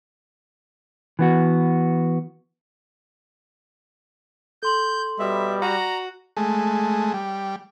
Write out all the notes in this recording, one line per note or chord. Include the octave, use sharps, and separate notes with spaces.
E3 B3 F#4
A4 C6 G6 F#7
B2 G3 E5
F#4 D5 A#5
G#3 A3
G3